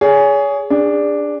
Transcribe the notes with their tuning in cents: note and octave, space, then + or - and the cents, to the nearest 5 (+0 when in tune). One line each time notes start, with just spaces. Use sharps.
G#4 +0 C#5 +35
D4 +0 G#4 -30